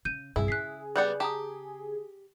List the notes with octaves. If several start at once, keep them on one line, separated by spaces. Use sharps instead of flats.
C#3 G6 D#7
C2 G2 E4 G#4
C#3 F#6 B6 C7
G3 B3 D5 F#6 G6 C#7
G4 A5 A#5 D#6